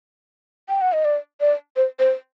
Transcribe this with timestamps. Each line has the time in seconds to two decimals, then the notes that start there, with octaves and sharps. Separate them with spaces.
0.69 G5
0.81 F#5
0.93 D#5
1.05 D5
1.41 D5
1.76 C5
1.99 C5